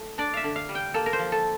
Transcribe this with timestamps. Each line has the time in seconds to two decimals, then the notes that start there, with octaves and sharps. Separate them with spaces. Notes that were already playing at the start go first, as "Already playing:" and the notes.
Already playing: A3
0.18 D4 D5
0.34 E5 F5
0.44 D3
0.56 F5
0.69 G3
0.75 G5
0.94 A#3 A4
1.06 A#4
1.13 C5
1.19 F3
1.32 A4